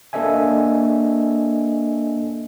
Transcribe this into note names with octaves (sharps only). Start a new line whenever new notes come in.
A#3 D4 A4 D#5 E5 G#5